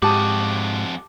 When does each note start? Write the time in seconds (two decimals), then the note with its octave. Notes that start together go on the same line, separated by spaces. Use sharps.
0.02 F2 G#2 F#4 G4 A5 D6 D#6